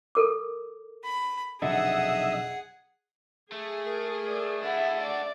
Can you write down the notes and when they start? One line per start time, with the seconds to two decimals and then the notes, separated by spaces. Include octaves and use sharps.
0.15 A4 A#4 D6
1.04 B5
1.62 F1 B1 D3 G#4 D#5 E5 F#5
3.52 A3 G#4
3.85 A#4
4.27 D5
4.63 A3 D4 E4 F#5
5.00 D5